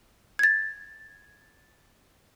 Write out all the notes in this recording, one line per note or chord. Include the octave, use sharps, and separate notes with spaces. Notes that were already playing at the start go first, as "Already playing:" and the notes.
G#6 A6